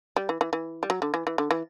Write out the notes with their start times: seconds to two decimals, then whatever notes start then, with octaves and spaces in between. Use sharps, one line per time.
0.16 G3
0.29 E3
0.41 E3
0.53 E3
0.83 G3
0.90 F#3
1.02 D3
1.14 E3
1.27 E3
1.38 D3
1.51 E3